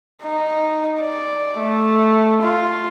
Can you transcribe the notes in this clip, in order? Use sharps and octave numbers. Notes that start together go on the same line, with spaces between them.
D#4
D5
A3
F4